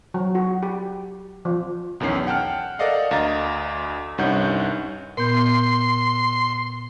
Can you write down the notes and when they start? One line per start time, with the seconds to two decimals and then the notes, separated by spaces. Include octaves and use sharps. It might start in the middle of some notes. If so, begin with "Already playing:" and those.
0.14 F#3
0.35 F#4
0.63 G4
1.45 F3
2.00 B1 E2 D#3 C#4 C7
2.27 F#5 G5 A5 F6
2.79 A4 A#4 D5 D#5 F5 F#5
3.11 D2 D#5 F5 A#5 A6
4.18 C2 G2 C#4 D#4 F#5 G6
5.17 A#2 B3 C6 G6